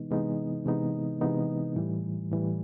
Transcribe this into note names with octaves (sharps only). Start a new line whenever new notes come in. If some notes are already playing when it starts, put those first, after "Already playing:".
Already playing: C3 E3 G#3 B3 D#4
C3 E3 G#3 B3 D#4
C3 E3 G#3 B3 D#4
C3 E3 G#3 B3 D#4
A2 E3 G3
A2 E3 G3